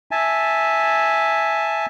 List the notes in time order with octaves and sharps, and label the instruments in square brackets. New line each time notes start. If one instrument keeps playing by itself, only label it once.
[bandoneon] E5 G#5 A5